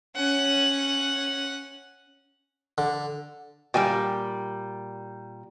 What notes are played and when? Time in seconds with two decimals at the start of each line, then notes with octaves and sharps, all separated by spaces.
0.16 C#4 F#5
2.78 D3
3.74 A#2 G3 D5 G5 G#5